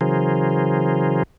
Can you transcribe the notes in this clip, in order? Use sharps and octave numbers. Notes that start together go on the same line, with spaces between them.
C#3 E3 F#3 G#4 A#4 C5